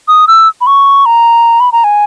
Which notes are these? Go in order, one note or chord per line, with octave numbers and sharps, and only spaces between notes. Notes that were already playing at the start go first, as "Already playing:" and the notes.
D#6
E6
B5
C#6
A#5
B5
A#5
G#5